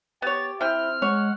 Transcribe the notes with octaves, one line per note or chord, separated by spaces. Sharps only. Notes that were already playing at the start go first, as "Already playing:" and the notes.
B3 G4 C#5 A6
C3 C4 E4 G5 F6
G#3 C#5 F#5